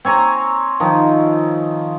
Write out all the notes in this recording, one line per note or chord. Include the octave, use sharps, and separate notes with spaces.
C4 C#5 G#5 A#5
D#3 F3 D#4